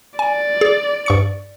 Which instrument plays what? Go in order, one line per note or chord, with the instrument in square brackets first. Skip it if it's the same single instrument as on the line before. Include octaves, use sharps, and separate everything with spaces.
[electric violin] D5 [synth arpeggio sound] G#5
[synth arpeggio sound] G#4
G2 C#6 C#7